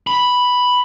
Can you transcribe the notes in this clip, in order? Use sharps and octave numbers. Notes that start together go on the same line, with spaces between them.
B5